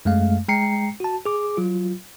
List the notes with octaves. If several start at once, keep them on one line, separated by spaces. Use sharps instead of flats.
F#2 G#3 A3 F5
G#3 G5 A#5 C7 C#7
F#4 A5
G#4 D6
F#3 F4